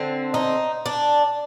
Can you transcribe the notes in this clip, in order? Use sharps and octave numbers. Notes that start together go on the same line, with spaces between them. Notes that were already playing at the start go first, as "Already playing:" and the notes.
Already playing: D3 C4
D#4
D4